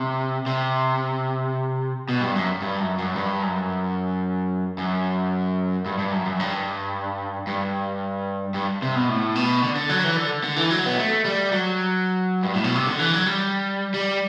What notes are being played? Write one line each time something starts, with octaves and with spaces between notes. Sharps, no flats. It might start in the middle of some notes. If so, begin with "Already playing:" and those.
Already playing: C3
C3
B2
G2
F#2
G2
F#2
F#2
G2
F#2
F#2
G2
G2
F#2
F#2
G2
G2
G2
C3
B2
A2
B2
D3
D3
F#3
E3
D3
D3
E3
F#3
B3
A3
G3
F#3
G2
A2
B2
C3
D3
E3
F#3
G3
G3